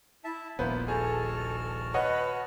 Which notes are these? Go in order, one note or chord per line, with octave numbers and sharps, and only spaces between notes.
E4 E5 A5
D#1 A#1 A#3 B3 C5
F#4 G#4 A4 A5 F6
B4 C#5 D#5 F#5